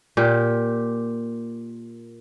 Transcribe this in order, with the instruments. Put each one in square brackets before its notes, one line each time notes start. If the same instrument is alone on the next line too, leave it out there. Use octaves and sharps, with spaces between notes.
[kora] A#2 G4